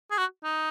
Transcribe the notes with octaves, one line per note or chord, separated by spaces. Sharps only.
G#4
F#4
D#4